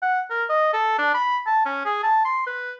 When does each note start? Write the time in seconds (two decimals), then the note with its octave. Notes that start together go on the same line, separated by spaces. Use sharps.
0.02 F#5
0.30 A#4
0.49 D#5
0.74 A4
0.98 D4
1.14 B5
1.47 A5
1.65 C#4
1.85 G#4
2.03 A5
2.25 C6
2.47 B4